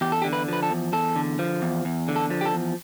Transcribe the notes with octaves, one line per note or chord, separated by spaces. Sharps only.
E2 G4
A4
G4
D3
B4
F3 B4
A4
E2
E2 A4
D3
F3
E2
E2
D3
A4
F3
G4
A4
E2